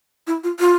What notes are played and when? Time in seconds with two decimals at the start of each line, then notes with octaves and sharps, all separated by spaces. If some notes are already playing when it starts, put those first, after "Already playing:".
0.27 E4
0.44 F4
0.60 F4